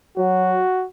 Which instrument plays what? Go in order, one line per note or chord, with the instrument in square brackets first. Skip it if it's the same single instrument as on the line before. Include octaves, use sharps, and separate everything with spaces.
[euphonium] F#3 [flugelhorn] F#4